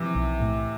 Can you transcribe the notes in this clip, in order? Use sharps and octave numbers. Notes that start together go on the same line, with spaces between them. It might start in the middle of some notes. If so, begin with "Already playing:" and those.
Already playing: C3 E3 F3
B1
A2